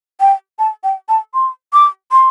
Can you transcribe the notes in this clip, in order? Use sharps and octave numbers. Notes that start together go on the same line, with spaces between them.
G5
A5
G5
A5
C6
D6
C6